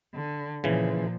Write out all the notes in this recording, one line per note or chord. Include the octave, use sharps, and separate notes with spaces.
D3
A#2 C#3 E3 F3